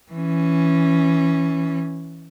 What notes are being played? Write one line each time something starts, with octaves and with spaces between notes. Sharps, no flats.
E3 C#4